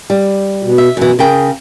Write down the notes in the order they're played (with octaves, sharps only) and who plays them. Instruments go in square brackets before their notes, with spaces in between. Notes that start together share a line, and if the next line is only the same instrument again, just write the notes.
[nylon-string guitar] G3
[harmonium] B2
[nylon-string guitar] E5
[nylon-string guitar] F#2 E3 [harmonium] B2
[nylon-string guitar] C#3 A#4 G5 [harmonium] G#4